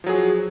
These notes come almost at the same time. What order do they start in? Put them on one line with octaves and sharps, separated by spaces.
F3 F#3 G#4